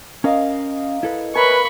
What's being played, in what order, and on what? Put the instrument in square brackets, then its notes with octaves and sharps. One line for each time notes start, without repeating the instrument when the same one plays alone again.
[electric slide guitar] C#4 [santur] A#4 D#5 F5
[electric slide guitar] E4 A4 B4
[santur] A#4 [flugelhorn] B4 [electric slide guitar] C#5 E5 G#5 [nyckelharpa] B5 C#6